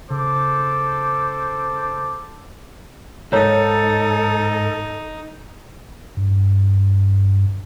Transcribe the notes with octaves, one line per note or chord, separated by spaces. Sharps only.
C#3 A4 C5 D6
C#2 G#2 D#4 A4 A#4 C#5 A#5
G2